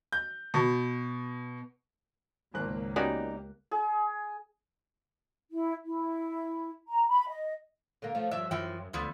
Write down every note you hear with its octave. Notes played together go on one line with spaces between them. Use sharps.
G6
B2
G#1 C#2 A#3 F#6
B3 C#4 D#4 F#4 G4 D5
G#4
E4
E4
A#5
B5
D#5
D3 A#3
F3 A3
G2 F3 D5 E5
F#2 E3 F3 E5 G5
D2 D3 F3 B3